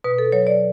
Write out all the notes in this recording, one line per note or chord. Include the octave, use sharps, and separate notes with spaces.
B2 B4
A4
F#3 C#5
D5